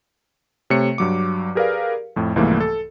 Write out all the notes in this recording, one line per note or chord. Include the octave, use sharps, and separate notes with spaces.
C3 A3 C#5 C#7
G2 F#3 D6
G4 G#4 A#4 B4 D5 F5
F2 A2
C2 G#2 E3 F3 A3 A#3
A4